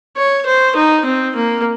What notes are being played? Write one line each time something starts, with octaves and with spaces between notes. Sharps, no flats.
C#5
C5
D#4
C4
A#3